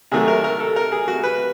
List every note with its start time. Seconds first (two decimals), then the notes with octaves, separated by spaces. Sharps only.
0.12 C3 D#3 F#3 A3 G#4
0.28 A#4
0.44 A#4
0.60 A4
0.76 A#4
0.92 G#4
1.08 F#4
1.23 B4